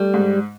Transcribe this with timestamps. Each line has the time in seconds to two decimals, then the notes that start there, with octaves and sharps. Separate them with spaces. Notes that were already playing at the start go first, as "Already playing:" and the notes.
Already playing: G3 A3
0.14 G#2